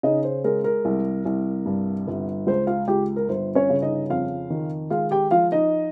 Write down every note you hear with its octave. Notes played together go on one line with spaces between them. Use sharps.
C#3 D#4 D#5
C5
G#3 A#4
A#4
C2
C2
G2
G1
C#2 C5
F4 F5
C#2 G4 G5
A#4
G1 C5
C#4 C#5
C#3
D#4 D#5
F2 F4 F5
D#3
G#3 F4 F5
G4 G5
F3 F4 F5
D#4 D#5